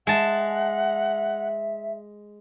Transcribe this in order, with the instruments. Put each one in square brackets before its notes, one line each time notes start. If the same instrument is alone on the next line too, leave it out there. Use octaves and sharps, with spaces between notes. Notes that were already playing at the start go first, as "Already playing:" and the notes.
[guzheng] G#3 A5 [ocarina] E5 [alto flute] F#5